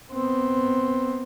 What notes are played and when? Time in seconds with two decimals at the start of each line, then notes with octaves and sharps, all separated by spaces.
0.13 B3 C4